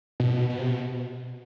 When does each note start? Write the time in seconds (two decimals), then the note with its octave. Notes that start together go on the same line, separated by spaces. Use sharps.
0.20 B2
0.49 B2
0.58 C3
0.68 B2